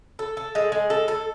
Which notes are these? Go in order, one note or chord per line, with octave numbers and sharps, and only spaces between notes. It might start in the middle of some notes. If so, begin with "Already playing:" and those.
A4
A4
G#3
G#3
A4
A4